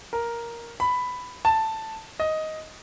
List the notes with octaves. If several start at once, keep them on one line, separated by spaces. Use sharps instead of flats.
A#4
B5
A5
D#5